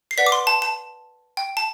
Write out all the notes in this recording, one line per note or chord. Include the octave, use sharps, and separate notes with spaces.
C7
B4 D5 F#5 B6
D6
C6
A5
A5
G5
A5